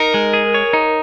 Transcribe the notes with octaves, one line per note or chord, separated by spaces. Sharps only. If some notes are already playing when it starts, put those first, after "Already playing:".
Already playing: D#4 A#4
G#3
G#4
C#5
D#4